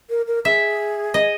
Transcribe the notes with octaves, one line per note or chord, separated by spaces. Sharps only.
A#4
A#4
G#4 E5
D#5